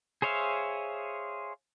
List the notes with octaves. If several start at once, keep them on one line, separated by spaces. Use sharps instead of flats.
G#4 C5 C#5 E5 F5